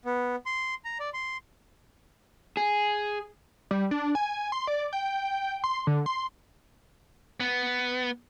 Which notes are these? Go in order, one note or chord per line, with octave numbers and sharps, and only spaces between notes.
B3
C6
A#5
D5
C6
G#4
G3
D4
G#5
C6
D5
G5
C6
D3
C6
B3